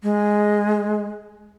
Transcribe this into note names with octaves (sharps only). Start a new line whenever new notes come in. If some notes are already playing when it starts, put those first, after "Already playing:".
G#3